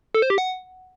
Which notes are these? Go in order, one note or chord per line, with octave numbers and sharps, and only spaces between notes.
A4
C5
G4
F#5